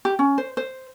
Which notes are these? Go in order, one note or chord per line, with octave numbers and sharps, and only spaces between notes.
G4
C#4
C5
C5